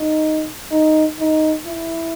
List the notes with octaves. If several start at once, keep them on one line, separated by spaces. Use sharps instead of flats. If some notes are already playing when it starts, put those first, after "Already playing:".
Already playing: D#4
D#4
D#4
E4